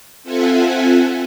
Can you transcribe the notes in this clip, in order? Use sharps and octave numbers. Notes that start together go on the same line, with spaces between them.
C4 F4 A4 E5 F#5 G#5